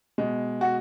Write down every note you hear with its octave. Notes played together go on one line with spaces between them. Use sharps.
B2 G#3
F#4